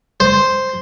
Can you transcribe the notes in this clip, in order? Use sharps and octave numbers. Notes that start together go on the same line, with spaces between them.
C5